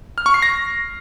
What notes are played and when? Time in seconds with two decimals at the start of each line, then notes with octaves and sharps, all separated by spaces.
0.18 F6
0.26 C#6
0.34 C7
0.42 A#6